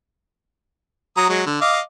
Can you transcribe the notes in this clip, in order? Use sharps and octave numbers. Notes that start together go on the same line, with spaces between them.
F#3 A#5 D#6
F#3 G#3
D3
D#5 F5 D6